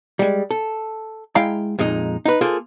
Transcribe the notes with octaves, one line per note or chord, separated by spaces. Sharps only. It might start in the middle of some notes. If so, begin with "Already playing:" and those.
G3 G#3
A4
G#3 E4 F5 G5 A#5
F2 A#2 G#3 D#4
D#4 B4
A#3 F4 G#4 A4 C5